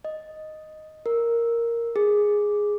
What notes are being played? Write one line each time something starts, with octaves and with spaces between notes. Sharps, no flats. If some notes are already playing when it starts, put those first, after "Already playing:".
D#5
A#4
G#4